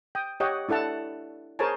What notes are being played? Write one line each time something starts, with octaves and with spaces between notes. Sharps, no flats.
G5 D#6
G4 C#5 D#5 F#5 G5
D4 E4 A4 F#5 A5
G#4 A#4 C5 C#5 G#5 A5